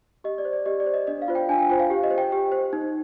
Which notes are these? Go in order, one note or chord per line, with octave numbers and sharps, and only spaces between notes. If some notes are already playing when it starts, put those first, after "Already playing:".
G4 D#5
D5
C5
D5
G4 D#5
D5
C5
D#5
D4 D#5
F5
F4 C5
G5
D4 G#5
G5
F4 C5 G5
F5
G4
D#5
C5
G5
G4
C5
D#4